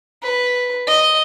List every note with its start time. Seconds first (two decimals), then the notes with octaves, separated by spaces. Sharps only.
0.23 B4
0.87 D#5